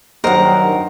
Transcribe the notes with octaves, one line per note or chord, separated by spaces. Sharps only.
G2 D#3 F#3 A#4 C5 D#5 F#5